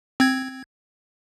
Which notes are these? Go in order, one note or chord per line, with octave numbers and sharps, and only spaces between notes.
C4 G#6